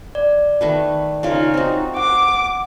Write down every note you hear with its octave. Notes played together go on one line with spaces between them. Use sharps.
D5
D#3 A3 B4
C#3 D#4 F4 A#4
C4 F#4
F#5 D6